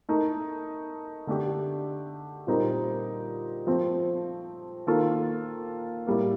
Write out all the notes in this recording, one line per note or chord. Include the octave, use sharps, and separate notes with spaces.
A3 D#4 A#4
D3 A3 D4 G4
A#2 G3 C4 D#4 A#4
F3 A3 C4
D#3 A#3 F4 A4
A2 G3 A#3